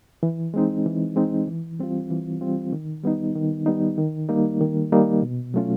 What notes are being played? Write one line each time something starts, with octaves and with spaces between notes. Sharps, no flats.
E3
G#3 C4 D#4
E3
G#3 C4 D#4
E3
G3 C4 F4
E3
G3 C4 F4
D#3
G3 B3 D#4
D#3
G3 B3 D#4
D#3
G3 A#3 D#4
D#3
G3 A#3 D#4
B2
F#3 A3 C#4 F4